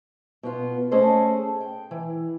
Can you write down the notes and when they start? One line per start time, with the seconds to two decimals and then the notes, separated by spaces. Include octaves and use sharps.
0.43 B2 B3 F4
0.91 A3 C#4 G#4 A4 C5 D#5
1.61 G5
1.91 E3